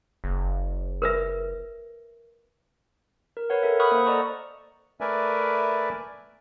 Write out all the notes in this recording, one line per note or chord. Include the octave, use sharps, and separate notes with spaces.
F#1
A#4 B4 E5
A#4
B4 C#5 F#5
A4 A#4 E5
F#5 B5 C#6 D#6 F6 F#6
A#3 C5 D#6
A4 D5 D#5 F#5 A#5 C#6
A3 A#4 B4 D5 E5 G#5